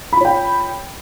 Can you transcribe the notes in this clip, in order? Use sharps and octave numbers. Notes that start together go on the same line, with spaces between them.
F4 C#5 G5 B5